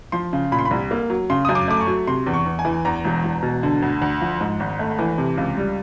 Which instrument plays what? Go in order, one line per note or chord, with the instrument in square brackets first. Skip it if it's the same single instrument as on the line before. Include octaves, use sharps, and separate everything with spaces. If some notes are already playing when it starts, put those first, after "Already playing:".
[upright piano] F3 C6
C#3
A#2 B5
C6
B5
C2
A#3
F#3
C#3 C6
F#2 D#6
D6
A3 D6
C#6
F#3
C3 C6
E2
C#6
E2
G#5
E3
E2 A#5
E1
E1
B2
D3
D2
D2
F3
G#2
G#1
A3
E3
C3
C#2
G3